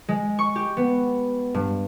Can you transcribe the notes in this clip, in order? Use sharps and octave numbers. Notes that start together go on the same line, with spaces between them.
G#3
C#6
G4
B3
G2